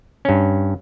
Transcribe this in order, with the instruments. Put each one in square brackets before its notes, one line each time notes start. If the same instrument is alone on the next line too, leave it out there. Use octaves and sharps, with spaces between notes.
[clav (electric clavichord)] G2 C#4